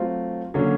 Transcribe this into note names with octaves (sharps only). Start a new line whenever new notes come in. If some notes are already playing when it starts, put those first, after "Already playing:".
Already playing: F#3 A3 C4 F4
D3 F#3 A#3 C#4